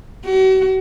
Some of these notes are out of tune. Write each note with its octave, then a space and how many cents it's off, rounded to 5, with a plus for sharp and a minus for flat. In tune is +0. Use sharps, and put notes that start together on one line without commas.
F#4 +40